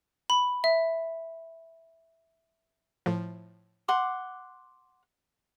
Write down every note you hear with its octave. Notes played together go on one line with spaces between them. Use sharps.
B5
E5
A2 F3
F#5 C6 D6